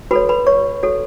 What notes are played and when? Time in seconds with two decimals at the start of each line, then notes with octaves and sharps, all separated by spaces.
0.11 F#4 A4 B4 C#5 B5
0.29 B4 B5
0.46 C#5 C#6
0.83 F#4 A4 C#5